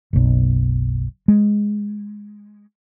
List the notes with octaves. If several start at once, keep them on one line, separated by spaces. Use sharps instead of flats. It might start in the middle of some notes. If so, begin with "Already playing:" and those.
F#1 B1
G#3